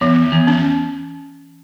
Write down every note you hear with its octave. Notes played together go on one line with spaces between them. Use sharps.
E2 E3
E2
C#4